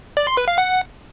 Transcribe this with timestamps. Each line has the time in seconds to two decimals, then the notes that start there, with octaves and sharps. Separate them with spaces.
0.17 D5
0.27 C6
0.37 B4
0.48 F5
0.58 F#5